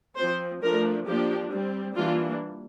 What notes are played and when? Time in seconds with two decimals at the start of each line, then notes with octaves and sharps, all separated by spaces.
0.17 F3 C4 C5
0.63 F3 A3 D4 A#4
1.07 F3 A#3 D4 G4
1.51 G3 C4
1.96 E3 G3 A#3 D4 F4